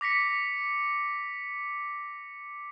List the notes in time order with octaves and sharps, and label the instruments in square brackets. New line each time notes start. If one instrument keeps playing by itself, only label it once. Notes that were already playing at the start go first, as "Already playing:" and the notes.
[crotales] D6 A#6 B6 C#7